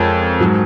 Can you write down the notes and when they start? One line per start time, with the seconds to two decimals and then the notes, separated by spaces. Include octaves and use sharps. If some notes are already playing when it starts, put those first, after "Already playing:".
Already playing: F2 F3 G#3 A#4 C#5
0.40 G#2 F#3